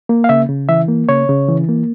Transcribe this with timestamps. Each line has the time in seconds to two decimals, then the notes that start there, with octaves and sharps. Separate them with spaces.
0.09 A#3
0.24 F5
0.29 C#3 E5
0.49 C#3
0.69 E3 E5
0.88 A#3
1.09 C#3 C#5
1.29 C#3
1.48 E3
1.69 A#3